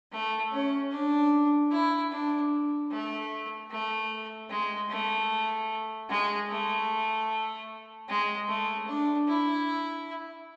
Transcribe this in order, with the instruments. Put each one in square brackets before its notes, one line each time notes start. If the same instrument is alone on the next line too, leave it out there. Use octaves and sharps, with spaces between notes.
[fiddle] A3
C#4
D4
E4
D4
A3
A3
G#3
A3
G#3
A3
G#3
A3
D4
E4